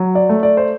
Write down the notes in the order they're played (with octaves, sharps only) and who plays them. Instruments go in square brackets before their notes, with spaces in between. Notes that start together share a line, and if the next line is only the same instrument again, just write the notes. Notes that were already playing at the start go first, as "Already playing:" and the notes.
Already playing: [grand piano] F#3
D5
A3
D5
C5